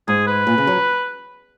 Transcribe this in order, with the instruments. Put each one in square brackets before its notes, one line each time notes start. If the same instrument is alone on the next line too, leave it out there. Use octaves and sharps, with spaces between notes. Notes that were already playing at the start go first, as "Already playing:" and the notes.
[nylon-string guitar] G#2 [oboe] G#4
[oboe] B4
[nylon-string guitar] A#2
C#3
F#3